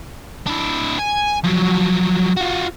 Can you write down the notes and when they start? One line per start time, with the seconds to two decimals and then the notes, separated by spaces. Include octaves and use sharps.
0.47 D4 E4
0.99 G#5
1.44 F3 F#3
2.37 F4 F#4